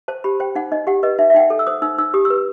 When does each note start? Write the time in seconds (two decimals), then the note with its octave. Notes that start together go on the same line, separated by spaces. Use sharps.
0.08 C5 A5
0.24 G4 B5
0.40 C5 G5
0.55 D#4 F#5
0.72 D#4 D#5
0.87 G4 F#5
1.03 B4 D#5
1.18 D#4 E5
1.30 E5
1.34 D#4 G5
1.40 F#5
1.50 A4
1.59 E6
1.67 C5 D#6
1.82 D#4 E6
1.98 D#4 E6
2.14 G4 D#6
2.25 E6
2.30 B4